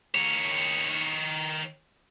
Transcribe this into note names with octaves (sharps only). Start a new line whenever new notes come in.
D#3 C#5